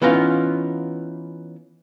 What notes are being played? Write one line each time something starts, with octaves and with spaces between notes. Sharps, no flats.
E3 B3 C#4 D#4 F4